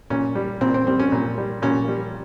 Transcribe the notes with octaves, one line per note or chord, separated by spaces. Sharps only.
A#2 C#4
G3
A#2 C4
C4
G3 C4
C#4
A#2
G3
A#2 C#4
G3